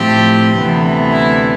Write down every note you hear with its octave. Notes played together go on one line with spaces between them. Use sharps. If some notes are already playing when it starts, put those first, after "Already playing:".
Already playing: A2 F3 A3 C4 G4
D2 C3 E3 B3
E4